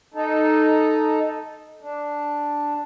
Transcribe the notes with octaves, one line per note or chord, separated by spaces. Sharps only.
D#4 A4
D4